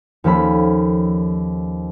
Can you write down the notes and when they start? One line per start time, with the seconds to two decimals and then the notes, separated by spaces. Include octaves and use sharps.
0.24 D#2 F3 C#4 A4 B5